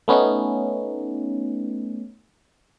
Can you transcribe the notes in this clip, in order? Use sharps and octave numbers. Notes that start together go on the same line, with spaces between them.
A3 B3 C#4 D#4